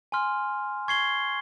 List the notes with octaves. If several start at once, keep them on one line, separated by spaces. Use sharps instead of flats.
G#5 C6 F6
C#6 G#6 C7 G7